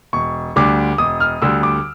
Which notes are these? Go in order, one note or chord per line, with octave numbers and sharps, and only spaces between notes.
E1 C#6
D2 D3 G3 D6
E1 D#6
F6
D2 D3 G3 E6
D6